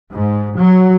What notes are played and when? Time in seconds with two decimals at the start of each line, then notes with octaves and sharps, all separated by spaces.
0.13 G#2
0.58 F#3